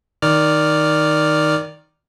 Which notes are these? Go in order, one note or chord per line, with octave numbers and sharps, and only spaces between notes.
D#3 D5 F6